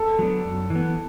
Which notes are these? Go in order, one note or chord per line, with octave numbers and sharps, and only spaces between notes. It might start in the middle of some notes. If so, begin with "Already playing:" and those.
Already playing: A4
F#3 B3 D4
F#2
E3
B3